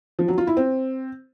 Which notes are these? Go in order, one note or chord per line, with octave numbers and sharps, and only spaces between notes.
F3
F#3
F4
E4
C4